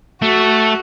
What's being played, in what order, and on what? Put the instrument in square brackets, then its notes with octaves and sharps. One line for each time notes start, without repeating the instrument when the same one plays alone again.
[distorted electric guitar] A3 [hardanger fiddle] F#4